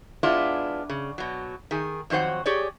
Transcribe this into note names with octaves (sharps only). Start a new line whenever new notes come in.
G#3 B3 D4 E4 F4
C#3
B2 F#3
D#3 G#4
F2 D#3 F#3 C5 F#5
G4 G#4 C#5 D5